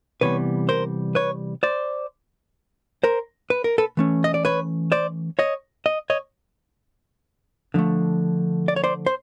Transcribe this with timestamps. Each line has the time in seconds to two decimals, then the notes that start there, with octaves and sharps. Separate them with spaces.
0.21 C3 E3 G3 B3 B4 C#5
0.69 A#4 C5
1.15 B4 C#5
1.63 C5 D5
3.04 A#4 C5
3.50 B4
3.64 A#4
3.78 A4 B4
3.97 E3 A3 C#4
4.24 D#5
4.34 D5
4.45 B4 C#5
4.92 C5 D5
5.39 C#5 D#5
5.86 D#5
6.10 C#5 D#5
7.74 D3 F3 A3
8.68 D5
8.76 C#5
8.84 C5 D5
9.06 C5